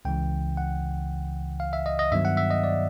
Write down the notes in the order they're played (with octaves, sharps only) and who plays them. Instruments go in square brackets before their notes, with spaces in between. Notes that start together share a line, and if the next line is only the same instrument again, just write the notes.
[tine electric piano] C#2 C#3 E3 G5
F#5
F5
E5
D#5
D#5
G2 D#3 F#3 B3 E5
F#5
E5
D#5
D5